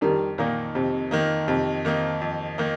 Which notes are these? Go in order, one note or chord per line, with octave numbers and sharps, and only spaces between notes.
F2 D#3 G3
A#2 D#3 A#3 D#4
F2 C3
D#3 A#3 D#4
F2 C3
D#3 A#3 D#4
F2
D#3 A#3 D#4